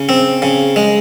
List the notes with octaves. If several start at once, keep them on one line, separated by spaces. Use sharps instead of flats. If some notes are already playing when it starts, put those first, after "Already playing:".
Already playing: C#3
C4
C#3
G#3